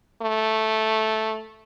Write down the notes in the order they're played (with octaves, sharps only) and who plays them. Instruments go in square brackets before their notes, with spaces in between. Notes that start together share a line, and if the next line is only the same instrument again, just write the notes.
[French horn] A3